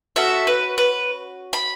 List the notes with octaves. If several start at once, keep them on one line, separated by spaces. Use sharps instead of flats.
C#4 F#4 A4 E5
B4
B4
B5